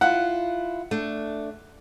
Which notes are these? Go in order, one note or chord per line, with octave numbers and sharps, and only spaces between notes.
E4 F4 F#5
A3 D4